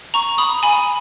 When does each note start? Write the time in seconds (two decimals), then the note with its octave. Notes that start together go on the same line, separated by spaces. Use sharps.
0.14 A#5 C#6
0.38 B5 D#6
0.63 G#5 B5